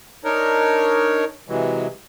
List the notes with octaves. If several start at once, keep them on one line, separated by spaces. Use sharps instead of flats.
D4 D#4 A#4 C#5
C3 E3 F#3 G#3